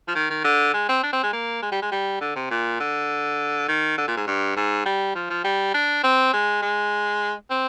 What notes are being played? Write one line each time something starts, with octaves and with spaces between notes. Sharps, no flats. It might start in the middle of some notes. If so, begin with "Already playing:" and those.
F3
D#3
D#3
D3
G#3
C4
D4
C4
G#3
A#3
G#3
G3
G#3
G3
D3
C3
A#2
D3
D#3
D3
A#2
G#2
G2
G#2
G3
F3
F3
G3
D4
C4
G#3
G#3
C4